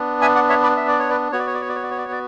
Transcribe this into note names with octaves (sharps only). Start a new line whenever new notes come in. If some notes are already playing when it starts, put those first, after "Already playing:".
Already playing: B3 D4
E5 G#5
D5 F#5
C#5 E5
B4 D5
E5
D5
C#5
B4 D5
B3 F#4 C#5
D5
C#5
D5
C#5
D5
C#5
D5
C#5
D5
C#5
D5